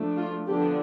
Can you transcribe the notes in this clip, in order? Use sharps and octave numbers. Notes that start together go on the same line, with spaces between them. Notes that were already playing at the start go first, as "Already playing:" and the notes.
Already playing: F3 A3 D4
F4
D3 F3 B3 D4 G4